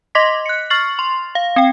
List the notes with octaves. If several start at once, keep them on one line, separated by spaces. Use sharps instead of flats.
D#5 C6 D6 A#6 B6
F#6 C#7
C#6 F6 A6 C7 F#7
C6
F5
C4 G5